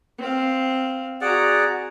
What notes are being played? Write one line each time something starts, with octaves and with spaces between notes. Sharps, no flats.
C4 F5
F#4 G#4 D5 F#5 A#5